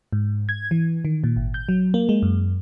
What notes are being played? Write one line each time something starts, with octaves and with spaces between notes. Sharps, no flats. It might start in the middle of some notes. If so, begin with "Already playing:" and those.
G#2
G#6
E3
D#3
A#2
G#1
G6
F#3
A#3
G#3
F#2